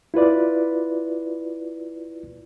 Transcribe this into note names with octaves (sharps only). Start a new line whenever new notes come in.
E4 F4 B4 D5